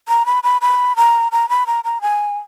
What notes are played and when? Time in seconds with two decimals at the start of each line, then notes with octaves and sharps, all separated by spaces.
0.08 A#5
0.26 B5
0.43 B5
0.61 B5
0.96 A#5
1.32 A#5
1.49 B5
1.67 A#5
1.84 A#5
2.01 G#5